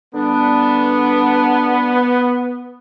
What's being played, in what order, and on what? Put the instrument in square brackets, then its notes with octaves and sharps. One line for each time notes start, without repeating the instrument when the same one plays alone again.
[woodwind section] D3 G3 D4 [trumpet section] B3